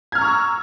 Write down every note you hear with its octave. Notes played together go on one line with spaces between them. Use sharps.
A#5 C#6 E6 F6 G#6